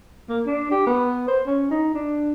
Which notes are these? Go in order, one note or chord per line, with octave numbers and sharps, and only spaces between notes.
A#3
D4
G4
B3
C5
C#4
D#4
D4